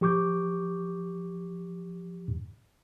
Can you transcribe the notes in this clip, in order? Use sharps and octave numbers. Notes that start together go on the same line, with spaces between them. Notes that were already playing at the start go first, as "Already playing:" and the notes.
F3 G4 C#6 D6 G6